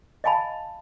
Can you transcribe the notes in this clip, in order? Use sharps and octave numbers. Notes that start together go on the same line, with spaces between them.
D#5 F5 G#5 A5 B5